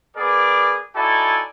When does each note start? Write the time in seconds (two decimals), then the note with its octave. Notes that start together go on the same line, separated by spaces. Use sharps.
0.17 B3 G#4 A#4 B4 D5
0.96 D#4 E4 F#4 A4 D5 G#5